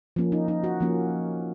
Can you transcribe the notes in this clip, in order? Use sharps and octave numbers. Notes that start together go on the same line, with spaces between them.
F3 A#3 C#4
D#4
D#4
F#4
F3 A#3 C#4